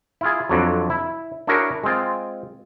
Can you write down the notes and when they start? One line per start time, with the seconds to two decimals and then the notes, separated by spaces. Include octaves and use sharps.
0.21 E4 F4 G#4
0.49 F2 D3 F#3
0.90 E4
1.47 D4 E4 F#4 G#4 A#4 C#5
1.84 G#3 C4 F4